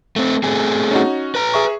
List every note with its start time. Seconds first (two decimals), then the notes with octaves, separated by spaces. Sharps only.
0.16 A3 C4
0.43 A3 C4 G#4
0.91 C#4 D#4 F#4
1.35 B4 A#5
1.54 G#4 E5 C#6